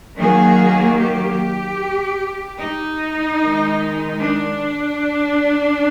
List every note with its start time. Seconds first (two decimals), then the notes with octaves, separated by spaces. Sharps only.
0.19 D#3 F#3 A#3 G#4
0.99 G4
2.60 D#4
3.40 D#3 G#3
4.20 D4